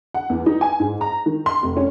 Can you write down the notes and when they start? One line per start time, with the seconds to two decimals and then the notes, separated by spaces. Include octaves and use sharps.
0.14 F#5
0.30 E2
0.46 D#4
0.61 G#5
0.80 G#2
1.01 A#5
1.26 D#3
1.46 C6
1.63 F1
1.77 C#4